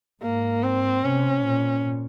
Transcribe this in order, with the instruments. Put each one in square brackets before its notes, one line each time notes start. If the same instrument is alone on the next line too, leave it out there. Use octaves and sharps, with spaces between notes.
[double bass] G#2 [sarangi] A#3
[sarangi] C4
[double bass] C3 [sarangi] C#4
[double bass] A#2